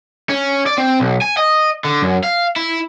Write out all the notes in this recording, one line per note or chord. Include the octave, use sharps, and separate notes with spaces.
C#4
D5
C4
B1
G#5
D#5
D3
F#2
F5
E4